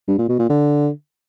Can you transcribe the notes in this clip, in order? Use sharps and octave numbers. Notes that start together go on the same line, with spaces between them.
G2
A#2
B2
A#2
D3